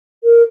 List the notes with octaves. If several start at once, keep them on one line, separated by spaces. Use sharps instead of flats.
A#4